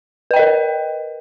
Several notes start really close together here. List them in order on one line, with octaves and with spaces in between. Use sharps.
B4 G5 D#5 A#4